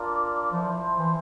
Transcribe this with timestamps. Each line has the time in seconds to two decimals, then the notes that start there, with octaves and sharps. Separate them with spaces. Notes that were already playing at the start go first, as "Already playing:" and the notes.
Already playing: D4 F4 A#4 D5
0.52 F3 E4 A4 C5
0.98 E3